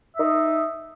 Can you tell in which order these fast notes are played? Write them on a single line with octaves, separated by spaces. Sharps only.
E5 D#4 D#5